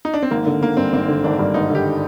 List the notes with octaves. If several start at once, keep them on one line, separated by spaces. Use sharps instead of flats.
D#4
D4
C4
G#1 A#3
D3
G#1 A#3
G2 C4
G#1 C4
D3
G#1 D4
G2
G#1 D#4
D3 G4